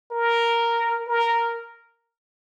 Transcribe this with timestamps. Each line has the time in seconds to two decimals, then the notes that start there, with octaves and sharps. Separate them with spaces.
0.12 A#4
1.08 A#4